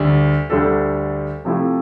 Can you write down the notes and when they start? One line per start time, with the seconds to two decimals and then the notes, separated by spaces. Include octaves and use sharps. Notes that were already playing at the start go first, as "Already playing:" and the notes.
Already playing: D2 D3 G3 D4
0.50 D2 D3 G3 D4 A4
1.45 C3 F3 A3 E4 G4